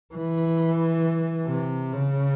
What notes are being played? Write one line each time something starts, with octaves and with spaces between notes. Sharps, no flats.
E3
C3
C#3